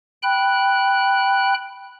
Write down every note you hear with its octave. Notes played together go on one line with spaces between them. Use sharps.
G5 B5 F#6